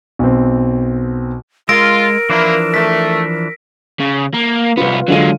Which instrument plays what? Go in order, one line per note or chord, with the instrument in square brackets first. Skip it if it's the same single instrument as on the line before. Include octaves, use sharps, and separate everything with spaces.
[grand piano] B1 C4
[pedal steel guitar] G#3 [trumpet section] F4 [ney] A#4 [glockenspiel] E6 A#6 D7
[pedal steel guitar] E3 F3 D4 [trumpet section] A#3 E4
[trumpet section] A3 [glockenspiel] B6
[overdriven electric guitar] C#3
A#3
[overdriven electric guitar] C2 B3 [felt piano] F4 B4
[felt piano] D3 F4 D#7 [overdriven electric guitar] F#3 G#3